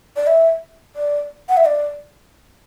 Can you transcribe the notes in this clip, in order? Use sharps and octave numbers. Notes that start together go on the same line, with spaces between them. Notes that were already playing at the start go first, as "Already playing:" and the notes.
D5
E5
D5
F#5
E5
D5